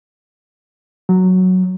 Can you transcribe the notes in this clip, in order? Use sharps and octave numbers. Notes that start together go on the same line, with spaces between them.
F#3